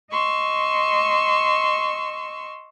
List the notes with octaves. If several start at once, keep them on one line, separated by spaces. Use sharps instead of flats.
D#5 C6 C#6 E6